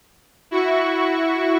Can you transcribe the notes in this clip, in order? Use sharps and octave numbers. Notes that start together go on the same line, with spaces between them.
E4 F#4 C#6